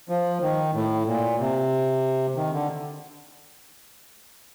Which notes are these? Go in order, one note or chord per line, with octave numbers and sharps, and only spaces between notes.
F3
D#3
A2
A#2
C3
D#3
D3